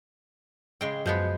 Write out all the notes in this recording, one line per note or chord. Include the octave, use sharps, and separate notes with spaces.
C#3 G#3 G5
F#2 F3 G#3 B3 F#4 G6